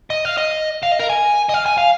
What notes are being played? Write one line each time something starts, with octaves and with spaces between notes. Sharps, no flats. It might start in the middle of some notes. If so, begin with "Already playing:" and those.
D#5
F5
D#5
F5
D#5
A#4
G#5
D#5
F5
G#5
F5